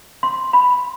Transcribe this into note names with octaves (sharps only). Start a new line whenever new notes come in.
C6
B5